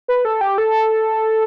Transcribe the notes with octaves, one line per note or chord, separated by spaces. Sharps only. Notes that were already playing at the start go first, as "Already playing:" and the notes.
B4
A4
G4
A4